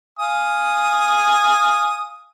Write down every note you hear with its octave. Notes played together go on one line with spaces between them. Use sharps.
F5 G#5 D#6